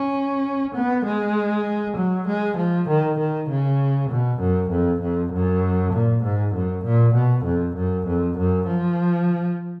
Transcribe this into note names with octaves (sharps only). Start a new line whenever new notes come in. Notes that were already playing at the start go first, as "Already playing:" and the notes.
Already playing: C#4
B3
G#3
F#3
G#3
F3
D#3
D#3
C#3
B2
F#2
F2
F2
F#2
A#2
G#2
F#2
A#2
B2
F2
F#2
F2
F#2
F3